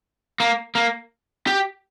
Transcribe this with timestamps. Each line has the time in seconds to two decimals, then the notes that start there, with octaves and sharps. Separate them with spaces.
0.40 A#3
0.75 A#3
1.47 G4